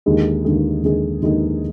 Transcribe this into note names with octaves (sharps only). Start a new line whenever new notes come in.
D#2 D3 G#3 D#4 G#4
D#2 D3 G#3 D#4 G#4
D#2 D3 G#3 D#4 G#4
D#2 D3 G#3 D#4 G#4